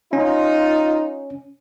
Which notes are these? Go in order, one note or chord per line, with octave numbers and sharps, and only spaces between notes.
C#4 D#4 F4